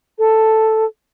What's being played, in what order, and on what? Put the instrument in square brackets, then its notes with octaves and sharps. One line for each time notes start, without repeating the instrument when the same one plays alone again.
[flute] A4